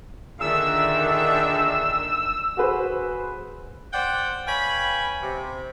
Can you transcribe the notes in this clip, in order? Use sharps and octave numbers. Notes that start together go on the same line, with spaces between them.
A#2 D3 D#3 D4 G#4 E5 E6
F#4 G#4 B4 C5
C5 D5 F#5 G5
B4 C#5 F5 G5 G#5 B5
C3